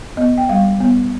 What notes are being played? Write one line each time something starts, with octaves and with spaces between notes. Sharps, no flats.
B3 D#5
G5
G3 F5
B3